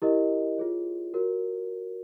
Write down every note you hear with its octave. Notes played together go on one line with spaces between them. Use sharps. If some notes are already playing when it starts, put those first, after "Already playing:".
E4 G4 A#4 D#5
F4 G#4 C#5
F#4 A#4 C#5